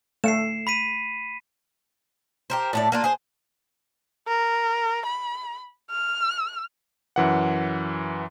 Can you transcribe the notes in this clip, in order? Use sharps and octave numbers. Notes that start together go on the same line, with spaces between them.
A3 C7 C#7 E7
B5 B6 D#7
G4 A#4 C5
A2 A3 D5
A#3 D4 F4
G#4 C5
A#4
B5
F6
F#2 E3 F#5